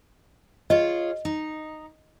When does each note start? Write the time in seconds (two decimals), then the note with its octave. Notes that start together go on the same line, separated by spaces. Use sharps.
0.70 F4 G#4 C#5 D#5
1.25 D#4